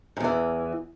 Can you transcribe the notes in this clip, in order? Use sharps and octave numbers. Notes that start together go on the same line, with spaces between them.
E2 G#2 E3